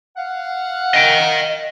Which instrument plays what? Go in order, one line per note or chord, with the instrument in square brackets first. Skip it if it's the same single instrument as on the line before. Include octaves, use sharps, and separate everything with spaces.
[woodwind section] F5 F#5
[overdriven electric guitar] D#5 G5